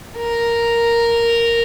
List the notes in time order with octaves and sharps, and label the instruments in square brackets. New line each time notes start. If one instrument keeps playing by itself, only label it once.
[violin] A#4